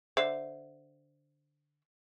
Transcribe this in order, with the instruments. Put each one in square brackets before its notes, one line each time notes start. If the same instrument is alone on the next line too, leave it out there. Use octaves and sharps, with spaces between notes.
[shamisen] D3 E5 [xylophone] C5 C7